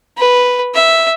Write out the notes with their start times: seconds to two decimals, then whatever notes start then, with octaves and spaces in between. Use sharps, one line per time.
0.18 B4
0.75 E5